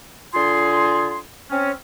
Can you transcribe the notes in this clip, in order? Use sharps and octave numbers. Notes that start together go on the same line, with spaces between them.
D3 F4 G#4 C6
C4 C#4